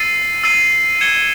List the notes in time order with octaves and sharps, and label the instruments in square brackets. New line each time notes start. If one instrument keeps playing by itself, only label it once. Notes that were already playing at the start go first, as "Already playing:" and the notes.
Already playing: [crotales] E6 A6 C7 D#7
E6 A6 C7 D#7
G#6 C#7 E7 G7